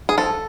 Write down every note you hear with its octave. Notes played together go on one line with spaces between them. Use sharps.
G#4
F3 A4